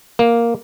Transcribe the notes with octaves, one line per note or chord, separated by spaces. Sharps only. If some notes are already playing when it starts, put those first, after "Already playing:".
A#3